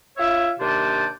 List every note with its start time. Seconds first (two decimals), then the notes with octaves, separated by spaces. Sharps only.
0.17 F4 C#5 E5
0.59 D#2 C3 D4 C5 D5